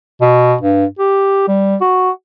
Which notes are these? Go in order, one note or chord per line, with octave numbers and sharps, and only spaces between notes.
B2
G2
G4
G3
F#4